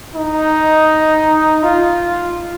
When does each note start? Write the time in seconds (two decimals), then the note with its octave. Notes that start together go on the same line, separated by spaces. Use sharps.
0.15 D#4
1.63 F4